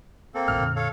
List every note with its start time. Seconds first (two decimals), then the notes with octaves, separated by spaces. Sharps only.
0.34 A#3 C4 A4
0.48 D1 G#1 A2 F6
0.60 F2 A#2 D3
0.76 A4 C#5 F5